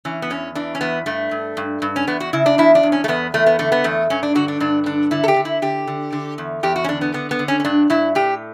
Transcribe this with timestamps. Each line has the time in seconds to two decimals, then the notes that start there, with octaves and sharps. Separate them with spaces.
0.05 E3 C#4
0.22 B3
0.30 E2 C#4
0.55 E3 D4
0.75 C#4
0.81 E2 B3
1.06 G2 A3
1.31 G2
1.57 G2
1.82 G2
1.96 C#4
2.07 E2 B3
2.20 F#4
2.33 C#3 E4
2.46 D4
2.58 E2 E4
2.75 D4
2.83 E2
2.92 C#4
3.04 A3
3.08 E2 B3
3.34 E2 A3
3.46 B3
3.59 D3 A3
3.72 B3
3.84 E2 A3
4.10 G2 C#4
4.23 D4
4.35 D3 F#4
4.48 D4
4.60 G2 D4
4.86 D3 D4
5.11 D3 E4
5.24 A4
5.28 G4
5.36 D3
5.45 E4
5.62 D3 G4
5.87 D3
6.12 D3
6.38 E2
6.63 E2 G4
6.76 F#4
6.84 C#4
6.88 D3 D4
7.01 B3
7.14 D3 B3
7.31 B3
7.39 D3
7.48 C#4
7.60 C#4
7.65 G2 D4
7.90 G2 E4
8.15 A2 G4